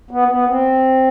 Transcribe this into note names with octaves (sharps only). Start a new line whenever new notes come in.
B3
B3
C4